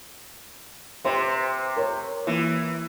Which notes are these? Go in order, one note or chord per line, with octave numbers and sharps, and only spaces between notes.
C3 B4 C5 C6
A#4 C#5
E3 A#3